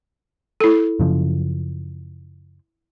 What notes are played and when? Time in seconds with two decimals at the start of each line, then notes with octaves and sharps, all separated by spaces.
0.61 E4 A4
1.00 F#2 C#3 F3